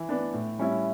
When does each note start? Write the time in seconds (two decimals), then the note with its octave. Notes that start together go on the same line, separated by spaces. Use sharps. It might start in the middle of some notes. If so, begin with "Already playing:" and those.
Already playing: E3
0.09 B3 D4
0.33 A2
0.59 G3 C#4 E4